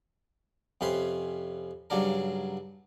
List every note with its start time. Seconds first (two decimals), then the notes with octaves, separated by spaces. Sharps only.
0.81 F2 C3 C#4 B4 C5 C6
1.90 G2 C#3 F#3 D4 A#4